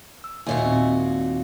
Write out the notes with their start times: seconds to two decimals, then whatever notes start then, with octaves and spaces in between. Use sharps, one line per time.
0.24 E6
0.47 D#2 A#2 F#4 D#5 E5 G#5
0.66 C4